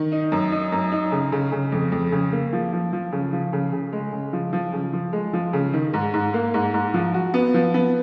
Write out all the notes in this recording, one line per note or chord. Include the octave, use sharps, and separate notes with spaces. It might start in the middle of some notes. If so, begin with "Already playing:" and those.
Already playing: D#3
D#4
F#2
D#4
F#2
D#4
C#3
C#3
C#3
F2
F2
C#3
A#3
F3
F3
F3
C#3
F3
C#3
C#3
G#3
C#3
F3
F3
C#3
F3
G#3
F3
C#3
D#3
G#2
G#2
A#3
G#2
G#2
F3
F#4
B3
F3
B3